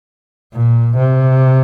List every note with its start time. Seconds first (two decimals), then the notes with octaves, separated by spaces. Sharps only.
0.53 A#2
0.96 C3